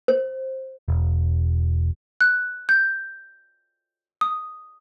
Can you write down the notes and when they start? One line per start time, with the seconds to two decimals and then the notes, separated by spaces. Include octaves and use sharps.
0.08 C5
0.88 E1
2.21 F#6
2.69 G6
4.21 D#6